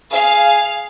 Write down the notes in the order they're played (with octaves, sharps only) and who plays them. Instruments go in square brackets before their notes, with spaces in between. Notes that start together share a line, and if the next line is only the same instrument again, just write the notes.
[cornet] G#4 [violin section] F5